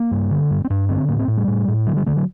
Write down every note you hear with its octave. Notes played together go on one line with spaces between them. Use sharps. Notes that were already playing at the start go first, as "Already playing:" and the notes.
Already playing: A#3
G2
D3
G2
C4
G2 D4
D3 C4
A2 A#3
C4
A2
G3
A2
A2
D3 F#3
G3
D3 A3
F#3